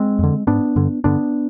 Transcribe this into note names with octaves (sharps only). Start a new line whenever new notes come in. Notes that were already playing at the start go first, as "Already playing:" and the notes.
Already playing: G#3 C4
F2 D3
G#2 B3 D4
G2 D3
G2 D3 B3 D4